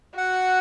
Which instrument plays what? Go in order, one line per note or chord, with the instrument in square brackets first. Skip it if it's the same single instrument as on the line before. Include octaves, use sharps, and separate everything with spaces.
[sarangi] F#4 [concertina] F#5